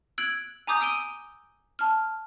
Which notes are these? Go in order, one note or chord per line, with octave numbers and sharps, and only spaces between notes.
E6 F#6 G#6 D7 F#7
G#5 A#5 D6 D#6 G6
D#6 E6 D7 D#7 G7
A5 F6